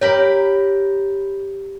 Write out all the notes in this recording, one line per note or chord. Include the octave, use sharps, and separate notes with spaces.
G4 A#4 C#5 B5